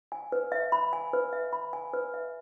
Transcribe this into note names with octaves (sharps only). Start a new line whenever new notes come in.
G#5
B4
E5
B5
G#5
B4
E5
B5
G#5
B4
E5